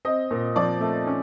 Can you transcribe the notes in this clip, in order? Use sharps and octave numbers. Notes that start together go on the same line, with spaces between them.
C4 D#5
A#2
F3 D5
A3
C#4